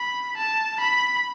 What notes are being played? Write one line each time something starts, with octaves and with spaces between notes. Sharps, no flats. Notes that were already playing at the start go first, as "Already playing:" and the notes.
Already playing: B5
A5
B5